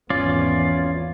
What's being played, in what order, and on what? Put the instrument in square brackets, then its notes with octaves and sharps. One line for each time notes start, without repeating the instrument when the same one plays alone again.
[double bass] G#1 E2 [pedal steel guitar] C#4 F4 D5